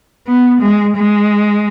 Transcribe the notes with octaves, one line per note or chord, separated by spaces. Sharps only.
B3
G#3
G#3